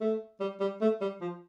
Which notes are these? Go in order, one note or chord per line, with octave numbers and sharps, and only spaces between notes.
A3
G3
G3
A3
G3
F3